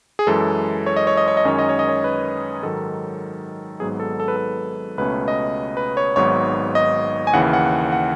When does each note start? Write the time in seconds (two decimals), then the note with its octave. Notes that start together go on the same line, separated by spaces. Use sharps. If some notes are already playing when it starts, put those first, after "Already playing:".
0.19 G#4
0.27 F#2 E3 G#3 A4
0.86 C#5
0.96 D#5
1.07 C#5
1.17 D#5
1.28 C#5
1.37 D#5
1.45 F#2 D#3 G#3 C#4 C#5
1.59 D#5
1.69 C#5
1.79 D#5
1.89 C#5
2.04 B4
2.63 G#2 D#3 F#3 A4
3.80 G#1 G#2 F#3 B3 G#4
4.00 A4
4.20 A4
4.28 B4
4.37 A4
4.98 C#2 B2 A3 C#4 B4
5.28 D#5
5.77 B4
5.97 C#5
6.16 G#1 G#2 F#3 B3 C#5
6.75 D#5
7.27 G#5
7.33 D#2 C#3 E3 F#5
7.53 F#5
7.92 F#5